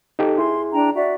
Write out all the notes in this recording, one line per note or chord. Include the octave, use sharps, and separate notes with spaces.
D#4 G4 A4
E4 G#4 C6
D4 G5 A#5
F#4 D5 E5